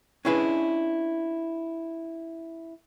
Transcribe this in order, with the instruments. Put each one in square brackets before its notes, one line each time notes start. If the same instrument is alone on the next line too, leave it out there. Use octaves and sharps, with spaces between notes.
[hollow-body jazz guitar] C#4 D4 E4 G#4 B4